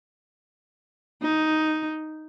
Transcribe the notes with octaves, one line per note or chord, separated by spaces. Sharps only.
D#4